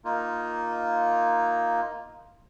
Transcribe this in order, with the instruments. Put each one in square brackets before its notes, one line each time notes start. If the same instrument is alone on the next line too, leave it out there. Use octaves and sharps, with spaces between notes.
[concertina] A#3 D#4 F4